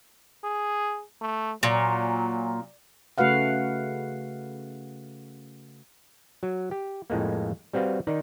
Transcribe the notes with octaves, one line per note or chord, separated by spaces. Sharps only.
G#4
A3
A#2 F#3
C#3 A3 F#4 B4 F5 F#5
F#3
G4
F2 A2 G#3 A#3
G3 C4 F#4 B4 F5
D#3 D#4 D5